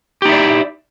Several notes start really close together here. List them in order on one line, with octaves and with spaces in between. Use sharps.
G4 D#4 E4 D5